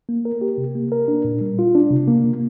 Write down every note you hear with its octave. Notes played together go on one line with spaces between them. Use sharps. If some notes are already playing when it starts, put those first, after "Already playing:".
A#3
A#4
G4
C3
A#3
A#4
D4
A#2
G3
F4
D4
C3
A#3
C3